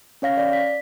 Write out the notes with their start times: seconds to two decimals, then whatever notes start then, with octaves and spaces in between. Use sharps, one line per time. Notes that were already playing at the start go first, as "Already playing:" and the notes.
0.22 C#4 C#5 F5 A#6
0.37 D5
0.53 B6